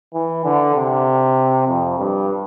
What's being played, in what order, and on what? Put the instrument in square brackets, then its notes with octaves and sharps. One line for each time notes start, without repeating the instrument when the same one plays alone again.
[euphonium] E3
D3
C3
F2
G2